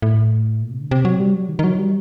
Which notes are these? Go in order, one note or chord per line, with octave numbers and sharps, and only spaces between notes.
A2
A#2
C3
D3
C3
F#3
G3
F#3
D#3
D#3
F#3
G3